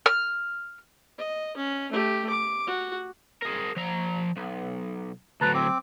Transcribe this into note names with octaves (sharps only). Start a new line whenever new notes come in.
F6
D#5
C#4
A3 G4
D6
F#4
G#4 A#4
F3 A#5
B1
D2 F#3 B4 A5 A#5
C4 D6